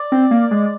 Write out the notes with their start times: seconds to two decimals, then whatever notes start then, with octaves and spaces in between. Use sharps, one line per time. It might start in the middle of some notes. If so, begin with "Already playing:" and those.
Already playing: D5
0.12 C4
0.31 A#3
0.51 G#3